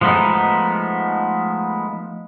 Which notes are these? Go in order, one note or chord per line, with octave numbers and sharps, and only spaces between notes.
F3 G#3 A3 B3 D#4